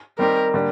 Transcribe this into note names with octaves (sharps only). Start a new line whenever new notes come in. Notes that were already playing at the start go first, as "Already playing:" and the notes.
D#3 G3 C4 D#4 G4 A#4
D3 G3 A#3